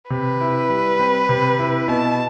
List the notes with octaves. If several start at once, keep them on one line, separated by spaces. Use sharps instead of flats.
C3 B4
E4
G3
C4
C3
E4
B2 A5